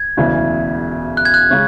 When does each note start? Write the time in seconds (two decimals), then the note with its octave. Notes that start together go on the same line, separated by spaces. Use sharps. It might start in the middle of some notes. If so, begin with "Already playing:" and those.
Already playing: G#6
0.17 E1 D2 C#3 E3
1.17 F#6
1.25 G#6
1.34 F#6
1.50 C#3 G#3 C#4